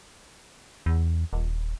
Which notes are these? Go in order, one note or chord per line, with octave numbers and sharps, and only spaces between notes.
E2
D#1